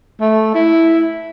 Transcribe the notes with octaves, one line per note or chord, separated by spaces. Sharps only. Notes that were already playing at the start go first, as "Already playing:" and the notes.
A3
E4